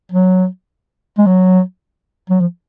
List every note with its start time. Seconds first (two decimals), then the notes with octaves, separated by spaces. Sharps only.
0.12 F#3
1.18 G#3
1.27 F#3
2.30 F#3
2.41 F3